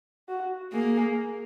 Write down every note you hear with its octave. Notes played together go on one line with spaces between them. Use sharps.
F#4
A#3 G#4